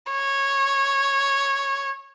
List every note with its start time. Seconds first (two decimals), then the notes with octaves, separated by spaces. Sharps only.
0.12 C#5